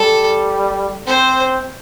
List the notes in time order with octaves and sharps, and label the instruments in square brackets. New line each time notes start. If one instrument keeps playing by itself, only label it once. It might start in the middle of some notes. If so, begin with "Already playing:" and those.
Already playing: [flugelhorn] G3 [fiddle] A4
[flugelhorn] C4 [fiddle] C5